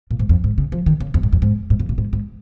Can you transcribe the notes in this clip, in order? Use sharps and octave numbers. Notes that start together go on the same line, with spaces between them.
A#2
G#2
F2
G#2
C#3
F3
D#3
C#3
F2
G#2
F2
G#2
G#2
F2
A#2
G#2
G#2